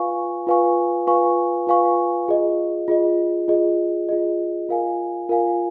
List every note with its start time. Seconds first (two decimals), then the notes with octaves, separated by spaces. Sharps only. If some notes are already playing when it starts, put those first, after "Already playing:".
Already playing: F4 B4 F5 G#5 C#6
0.47 F4 B4 F5 G#5 C#6
1.07 F4 B4 F5 G#5 C#6
1.67 F4 B4 F5 G#5 C#6
2.28 F4 G#4 D#5
2.88 F4 G#4 D#5
3.48 F4 G#4 D#5
4.09 F4 G#4 D#5
4.69 F4 A#4 F5 G#5
5.29 F4 A#4 F5 G#5